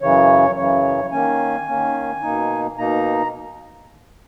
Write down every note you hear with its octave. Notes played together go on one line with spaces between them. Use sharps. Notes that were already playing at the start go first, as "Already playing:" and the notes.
F#2 C#3 E3 C#5
F#2 C#3 E3 C#5
D#3 A#3 C#4 G#5
D#3 A#3 C#4
B2 A#3 D#4
B2 A#3 D#4 A#5